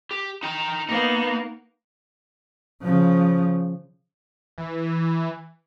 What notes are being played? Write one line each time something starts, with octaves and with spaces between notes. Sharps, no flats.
G4
D#4 G5 A#5
A#3 B3 D#4
C#3 F3
E3